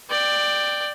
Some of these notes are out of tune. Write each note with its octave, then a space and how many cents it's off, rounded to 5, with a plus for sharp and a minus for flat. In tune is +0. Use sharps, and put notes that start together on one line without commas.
D5 +15 G5 +0